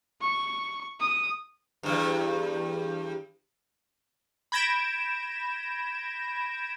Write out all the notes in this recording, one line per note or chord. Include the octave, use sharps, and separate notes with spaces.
C#6
D#6
E2 G2
B5 G6 G#6 A#6 D7 E7